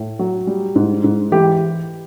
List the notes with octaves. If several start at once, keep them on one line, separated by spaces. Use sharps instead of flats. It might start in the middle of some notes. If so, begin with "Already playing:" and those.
Already playing: A2
F#3
G3
G#2
G#2
E3 G4